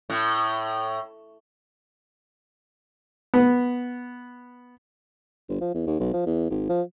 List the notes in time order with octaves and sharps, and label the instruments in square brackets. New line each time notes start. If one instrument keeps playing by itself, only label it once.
[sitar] A2
[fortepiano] B3
[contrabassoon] G1
F3
E2
D#2
B1
F3
E2
G#1
F3